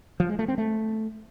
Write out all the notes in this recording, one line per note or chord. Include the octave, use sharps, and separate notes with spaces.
F3
G#3
A3
C4
A3